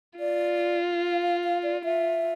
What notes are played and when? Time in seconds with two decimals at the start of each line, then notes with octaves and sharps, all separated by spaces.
0.19 F4 D5
1.02 F5
1.22 F5
1.44 F5
1.63 D5
1.84 F4 E5